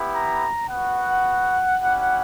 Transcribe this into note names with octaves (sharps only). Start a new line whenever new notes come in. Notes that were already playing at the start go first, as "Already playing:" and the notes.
Already playing: B3 E4 G4
A#5
B3 F#4 F#5
C#4 E4 G4